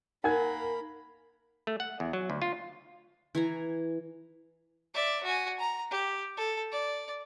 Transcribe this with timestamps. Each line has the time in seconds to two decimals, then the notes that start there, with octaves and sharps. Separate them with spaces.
0.24 A#3 D#4 A#4 F#5 G#5 B5 G#6
1.67 A3
1.80 F#5
2.00 E2
2.13 F#3
2.30 D2
2.42 F4
3.35 E3 G#5 A#5
4.94 D5 E5
5.23 F#4 G#5
5.60 A#5
5.90 G4
6.37 A4
6.72 D5